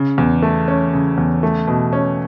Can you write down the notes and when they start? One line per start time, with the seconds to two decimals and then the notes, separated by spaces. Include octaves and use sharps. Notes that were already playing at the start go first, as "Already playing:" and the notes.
Already playing: C#3
0.18 E2
0.42 A3
0.68 C#4
0.93 C#3
1.18 E2
1.43 A3
1.67 B2
1.93 C#4